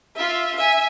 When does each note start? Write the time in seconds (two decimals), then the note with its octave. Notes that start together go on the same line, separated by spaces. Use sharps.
0.16 F4 E5
0.57 E5 G#5